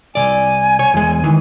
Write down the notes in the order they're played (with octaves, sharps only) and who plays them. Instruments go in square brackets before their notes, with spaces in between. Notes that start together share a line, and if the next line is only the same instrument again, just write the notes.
[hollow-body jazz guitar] C2 C3 D5 [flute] G#5
[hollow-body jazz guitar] C#5
E2 G#3
D#3 E3